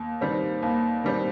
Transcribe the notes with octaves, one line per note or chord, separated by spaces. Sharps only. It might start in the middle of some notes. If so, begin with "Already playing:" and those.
Already playing: D#2
D#3 G3 C4
D#2
D#3 G3 C4